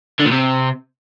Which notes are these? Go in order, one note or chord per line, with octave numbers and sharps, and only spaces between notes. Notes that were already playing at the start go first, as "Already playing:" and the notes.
D3
A#2
C3